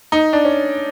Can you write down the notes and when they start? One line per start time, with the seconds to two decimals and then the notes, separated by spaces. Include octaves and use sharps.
0.12 D#4
0.33 D4
0.45 C#4